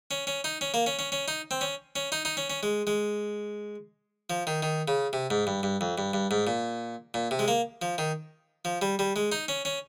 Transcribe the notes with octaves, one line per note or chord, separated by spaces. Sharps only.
C#4
C#4
D#4
C#4
A#3
C#4
C#4
C#4
D#4
C4
C#4
C#4
D#4
D#4
C#4
C#4
G#3
G#3
F3
D#3
D#3
C#3
C3
G#2
G2
G2
F2
G2
G2
G#2
A#2
A#2
C3
G#3
A#3
F3
D#3
F3
G3
G3
G#3
D#4
C#4
C#4